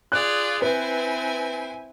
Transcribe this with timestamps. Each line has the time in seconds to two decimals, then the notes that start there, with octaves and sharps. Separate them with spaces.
0.12 F4 G#4 D5 F#6
0.62 C4 E4 B4 G#5